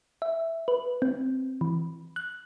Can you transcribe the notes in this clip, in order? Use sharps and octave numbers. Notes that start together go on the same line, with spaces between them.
E5
B4
C4
E3
F#6